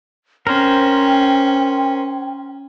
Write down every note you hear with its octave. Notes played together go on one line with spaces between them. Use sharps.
C#4 A#4 C5 G5